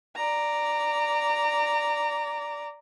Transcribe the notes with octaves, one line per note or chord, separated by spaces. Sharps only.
D5 A#5